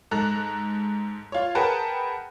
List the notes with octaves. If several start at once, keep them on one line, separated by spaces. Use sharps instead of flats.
G#2 A4 A#5 F#6
F4 C#5
G#4 A#4 B4 F#5 G5 A5